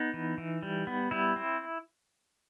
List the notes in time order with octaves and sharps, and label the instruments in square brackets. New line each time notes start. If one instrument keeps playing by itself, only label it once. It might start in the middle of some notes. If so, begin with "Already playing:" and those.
Already playing: [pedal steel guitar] B3 D#4
E3
E3
G3
B3
G3 E4
C4